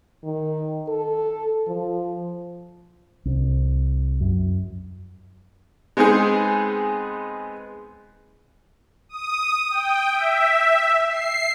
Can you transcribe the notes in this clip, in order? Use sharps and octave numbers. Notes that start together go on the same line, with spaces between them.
D#3
A4
F3
C2
F#2
G#3 B3 C4 D#4 G#4
D#6
G5
E5
C7